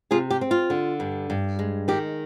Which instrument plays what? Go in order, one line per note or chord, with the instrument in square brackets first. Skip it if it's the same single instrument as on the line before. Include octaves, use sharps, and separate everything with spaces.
[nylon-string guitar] C3 F4 G#4
G4
C4
F4
D3
G2
G2
G#3
D#3 G4